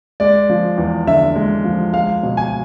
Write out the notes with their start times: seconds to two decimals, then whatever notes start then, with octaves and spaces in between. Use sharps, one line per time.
0.20 G#3 D5
0.50 F3
0.78 E2
1.07 D3 E5
1.36 G#3
1.64 F3
1.94 G#3 F5
2.23 B2
2.37 G#5